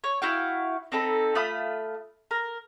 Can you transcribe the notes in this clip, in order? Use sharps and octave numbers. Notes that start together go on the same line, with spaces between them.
C#5
E4 F#4 F5 G5
C4 D#4 A4 B5
A3 F4 B5 D#6
A#4